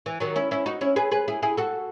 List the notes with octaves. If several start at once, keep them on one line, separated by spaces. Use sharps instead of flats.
E3
D#3 F#3
C#4 E4
C#4 E4
D#4 F#4
C#4 E4
G#4 B4
G#4 B4
E4 G#4
E4 G#4
F#4 A4